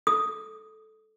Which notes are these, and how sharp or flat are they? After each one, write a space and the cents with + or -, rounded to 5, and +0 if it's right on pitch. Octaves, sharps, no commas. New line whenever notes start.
A4 -10 D#6 +0